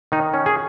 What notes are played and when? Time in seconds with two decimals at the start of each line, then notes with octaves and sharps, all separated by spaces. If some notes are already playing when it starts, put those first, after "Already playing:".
0.12 D#3 D#4
0.34 C#4
0.46 G#4